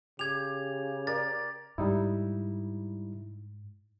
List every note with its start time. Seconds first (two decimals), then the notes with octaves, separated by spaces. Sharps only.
0.19 C#3 G4 G#6 F7
1.07 A#4 D5 A6
1.78 G#2 G3 D#4 E4